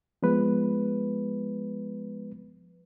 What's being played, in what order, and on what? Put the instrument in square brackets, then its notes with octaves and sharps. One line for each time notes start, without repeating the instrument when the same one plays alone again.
[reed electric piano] F3 G#3 B3 B4